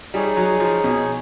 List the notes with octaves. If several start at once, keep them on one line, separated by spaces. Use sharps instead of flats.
G3 D#4 G#4 C#5
F#3
F3
B2